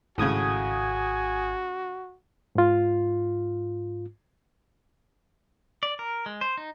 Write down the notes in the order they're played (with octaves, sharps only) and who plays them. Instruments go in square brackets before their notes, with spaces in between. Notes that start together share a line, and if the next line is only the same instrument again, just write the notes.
[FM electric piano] G#1 D#6 G#6 [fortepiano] A2 C#3 [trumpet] F#4 [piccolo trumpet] G#5
[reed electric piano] G#2 F4
[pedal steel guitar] D5
A#4
G#3
C5
D#4